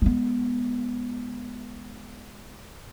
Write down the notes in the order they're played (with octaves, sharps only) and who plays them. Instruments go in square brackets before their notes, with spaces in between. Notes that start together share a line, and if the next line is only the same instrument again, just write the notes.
[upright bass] G#3 B3